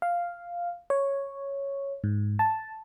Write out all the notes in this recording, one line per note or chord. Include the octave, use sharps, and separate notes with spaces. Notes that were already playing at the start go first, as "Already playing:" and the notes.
F5
C#5
G#2
A5